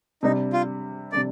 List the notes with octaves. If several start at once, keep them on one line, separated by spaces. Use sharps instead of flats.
C3 G3 D4 D#4
F4
C3 G3 D4 D5